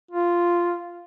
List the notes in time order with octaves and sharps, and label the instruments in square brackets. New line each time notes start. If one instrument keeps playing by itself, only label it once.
[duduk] F4